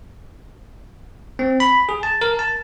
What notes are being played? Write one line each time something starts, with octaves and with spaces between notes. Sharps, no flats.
C4
B5
G#4
A5
A#4
A5